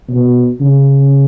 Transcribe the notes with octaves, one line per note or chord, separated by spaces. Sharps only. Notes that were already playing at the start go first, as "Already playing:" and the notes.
B2
C#3